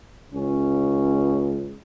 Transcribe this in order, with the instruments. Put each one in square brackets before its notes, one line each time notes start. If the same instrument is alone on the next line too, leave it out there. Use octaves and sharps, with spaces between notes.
[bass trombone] C#2 [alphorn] C#4